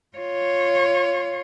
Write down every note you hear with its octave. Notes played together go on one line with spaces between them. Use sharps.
F4 C#5